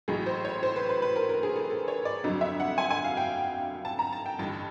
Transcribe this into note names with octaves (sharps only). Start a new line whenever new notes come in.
A1 A2 F#3 G#4
C5
C#5
C5
B4
B4
B4
A#4
A#4
G#4
A4
A4
C#5
D5
G1 F2 D3 F#3 D#5
E5
F#5
G#5
G#5
F5
G5
A5
A#5
A5
G5
A1 G2 D3 A5